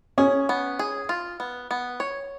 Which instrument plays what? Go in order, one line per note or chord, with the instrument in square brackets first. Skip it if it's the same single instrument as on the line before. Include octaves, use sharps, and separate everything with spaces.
[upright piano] C#4 [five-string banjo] G#4
[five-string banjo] B3
G#4
F4
B3
B3
C#5